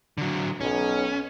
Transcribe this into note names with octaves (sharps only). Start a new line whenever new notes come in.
D3 F#3
B1 C#4